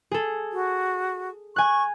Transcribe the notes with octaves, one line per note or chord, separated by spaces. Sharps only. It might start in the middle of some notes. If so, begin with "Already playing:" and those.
G#4 A4
F#4
G#5 C#6 F#6